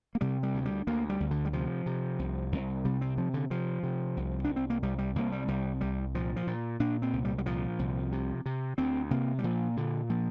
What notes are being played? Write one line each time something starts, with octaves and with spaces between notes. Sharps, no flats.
A#3
C3 G3
G3
D2
G3
D2 A#3
G3
D2
D3
G3
C3 F3
C3
C2
C2
C3 G3
C4
C3 F3
D3
C3 F3
C3
C2
C2 D4
C4
A#3
C2 G3
G3
C2 A#3
G3
C2 G3
C2 G3
A#2 F3
F3
A#2
A#2 D4
C4
C2
G3
G3
A#2 F3
C2
C3
C3
D2 C4
C3 A#3
G3
A#2 F3
A#2 D3
A#2 F3